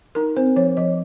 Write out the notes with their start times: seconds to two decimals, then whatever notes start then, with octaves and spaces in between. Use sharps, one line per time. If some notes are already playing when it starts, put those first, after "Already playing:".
0.15 D#4 A#4
0.36 C4 C5
0.56 F3 C#5
0.77 F3 D#5